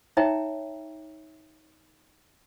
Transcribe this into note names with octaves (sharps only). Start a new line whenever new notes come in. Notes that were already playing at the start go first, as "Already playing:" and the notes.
D#4 C#5 E5 G5 A#5